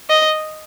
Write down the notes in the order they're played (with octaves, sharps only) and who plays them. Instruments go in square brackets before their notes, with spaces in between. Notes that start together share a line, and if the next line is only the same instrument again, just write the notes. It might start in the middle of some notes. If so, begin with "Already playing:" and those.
[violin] D#5